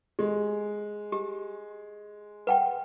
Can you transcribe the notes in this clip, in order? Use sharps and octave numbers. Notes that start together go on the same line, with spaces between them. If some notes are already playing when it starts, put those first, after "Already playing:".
G#3 G4
G4
B4 F#5 G5